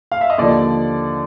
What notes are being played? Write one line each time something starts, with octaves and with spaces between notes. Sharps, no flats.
F5
E5
D#5
D#2 D3 F3 D5